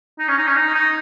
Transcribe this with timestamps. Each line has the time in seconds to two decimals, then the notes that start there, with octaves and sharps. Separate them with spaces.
0.19 D#4
0.28 C#4
0.38 D#4
0.47 C#4
0.56 D#4
0.75 D#4